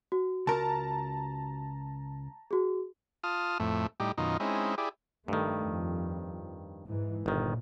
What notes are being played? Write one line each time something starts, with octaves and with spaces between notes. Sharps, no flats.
F#4
C#2 A#4 A5 A#5
F#4 G#4
F4 A5 D#6 F6
F2 A2 A3
A2 G3 D#4 G4
F#2 B2 D#3 D#4 F4
G#3 C4 C#4 D#4 E4
E4 G4 G#4 D5
G2 D#3 A3
F2
G#2 E3
G1 A#2 D#3